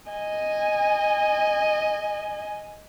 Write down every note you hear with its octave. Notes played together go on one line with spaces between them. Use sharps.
D#5 G#5